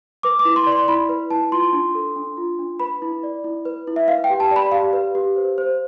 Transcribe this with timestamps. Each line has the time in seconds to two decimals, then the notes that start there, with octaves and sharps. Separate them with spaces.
0.23 B4 D6
0.39 D6
0.45 E4
0.56 C6
0.67 D5
0.72 C6
0.88 E4 B5
1.09 B4
1.30 E4 A5
1.52 F4 C6
1.73 D4
1.95 A4
2.16 D4
2.37 F4
2.59 D4
2.80 B4 B5
3.02 E4
3.23 D5
3.44 E4
3.65 B4
3.87 E4
3.96 E5
4.08 B4 F5
4.24 G5
4.30 G4
4.40 A5
4.51 D5 B5
4.72 G4 F5
4.93 B4
5.15 G4
5.36 C5
5.58 C5